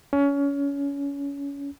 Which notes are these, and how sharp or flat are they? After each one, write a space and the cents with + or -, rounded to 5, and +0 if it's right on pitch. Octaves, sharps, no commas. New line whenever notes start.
C#4 +25